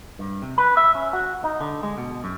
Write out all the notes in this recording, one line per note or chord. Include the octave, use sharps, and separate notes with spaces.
G2
C3
B4
E5
C#4
F#4
D#4
D3
G#3
B2
F#2